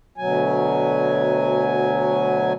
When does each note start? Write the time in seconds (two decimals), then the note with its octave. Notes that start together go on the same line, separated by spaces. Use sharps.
0.18 D2 B2 F#3 G#5